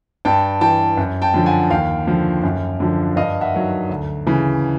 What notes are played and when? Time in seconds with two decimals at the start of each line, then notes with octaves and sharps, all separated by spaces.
0.25 G2 G5 A5
0.61 E3 G5 A5
0.97 F#2
1.22 G5 A5
1.34 D3 F3
1.46 F#5 G#5
1.70 D#2 F5 G5
2.07 D3 F3
2.43 F#2
2.80 D3 F3
3.16 G2 D#5 F5
3.41 E5 F#5
3.54 D#3 F#3
3.89 D2
4.27 C#3 E3